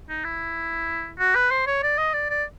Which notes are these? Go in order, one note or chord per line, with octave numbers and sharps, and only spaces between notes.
D#4
E4
F#4
B4
C5
C#5
D5
D#5
D5
D5